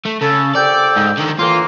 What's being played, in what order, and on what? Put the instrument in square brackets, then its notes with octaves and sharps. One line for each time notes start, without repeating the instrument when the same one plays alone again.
[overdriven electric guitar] A3
[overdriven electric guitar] C#3 [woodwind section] A4
[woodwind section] C2 A4 G5 [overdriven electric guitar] D5
[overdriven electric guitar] G#2
D3 D#3
[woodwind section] A2 E3 A#3 [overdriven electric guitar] F4